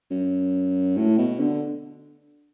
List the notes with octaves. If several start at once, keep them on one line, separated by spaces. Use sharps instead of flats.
F#2
A2
B2
D3